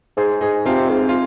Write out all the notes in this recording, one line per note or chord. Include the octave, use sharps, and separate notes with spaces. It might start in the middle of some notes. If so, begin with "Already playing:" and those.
G#2 G#4 C5
G#2 D#4 G#4
C3 C4 F4
G#2
F4